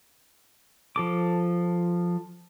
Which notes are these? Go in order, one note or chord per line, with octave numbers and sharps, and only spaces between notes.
F3 A4 D6